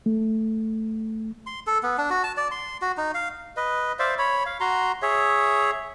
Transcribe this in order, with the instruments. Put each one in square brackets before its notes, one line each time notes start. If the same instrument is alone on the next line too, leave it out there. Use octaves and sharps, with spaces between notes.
[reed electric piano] A3
[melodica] C6
A4
B3
D4
F#4
A5
D5
C6
F#4
D#4
F5
B4 D#5
C5 D5 E5 F5
C#5 B5
F5
F#4 A#5 C6
G#4 C#5 E5